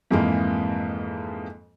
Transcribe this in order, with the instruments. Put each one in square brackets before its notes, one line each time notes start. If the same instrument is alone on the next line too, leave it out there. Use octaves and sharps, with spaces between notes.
[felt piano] F2 G#2 E3 G#3 A#3